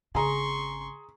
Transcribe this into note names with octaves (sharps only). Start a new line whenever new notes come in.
G#1 C#3 G#4 A#5 C6 C#6